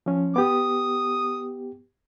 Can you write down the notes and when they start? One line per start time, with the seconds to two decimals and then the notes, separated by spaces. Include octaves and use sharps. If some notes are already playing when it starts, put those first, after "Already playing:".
0.06 F3 C#4
0.36 B3 G4 D#6